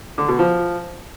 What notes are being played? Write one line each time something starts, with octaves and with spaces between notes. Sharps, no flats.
D3
B2
F3